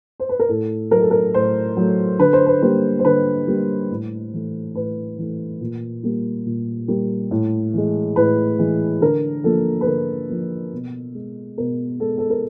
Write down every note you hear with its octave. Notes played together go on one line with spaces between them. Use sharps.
C5
B4
A#4
A2 A4
F#3 A3 A#4
A4
A#4
A2 C5
F#3 A3
D3 B4
C5
B4
G3 A#3 C5
C5
D3 B4
G3 A#3
A2
E3 A3
A2 B4
E3 A3
A#2
G3 A#3
A#2
G3 A#3
A2
E3 G#3
A2 B4
E3 G#3
D3 A#4
F3 A#3 A4
B4
D3 A#4
F3 A#3
B2
G#3
B2 A#4
G#3 A4
A4
A#4